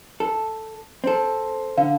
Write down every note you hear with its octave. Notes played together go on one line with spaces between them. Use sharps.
A4
C4 A4
D3 F5